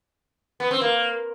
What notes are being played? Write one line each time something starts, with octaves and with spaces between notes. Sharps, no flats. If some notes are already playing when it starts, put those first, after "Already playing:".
B3
C4
A#3